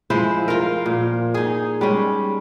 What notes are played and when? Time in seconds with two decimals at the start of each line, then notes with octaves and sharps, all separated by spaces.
0.10 F3 G#3 E4 C5
0.48 F4 A#4
0.86 A#2
1.34 D#4 G#4
1.81 G3 G#3 C#4